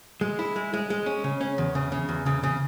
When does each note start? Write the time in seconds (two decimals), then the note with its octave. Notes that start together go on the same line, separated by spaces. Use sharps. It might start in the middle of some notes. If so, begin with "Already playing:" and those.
0.21 G#3
0.39 E4
0.56 G#3
0.73 G#3
0.90 G#3
1.06 C#4
1.24 C#3
1.41 C#4
1.58 E2
1.75 C#3
1.92 C#3
2.09 E2
2.26 C#3
2.43 C#3